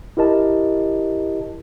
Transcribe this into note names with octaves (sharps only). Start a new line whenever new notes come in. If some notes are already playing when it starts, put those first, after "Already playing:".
E4 G4 A#4 D#5 A5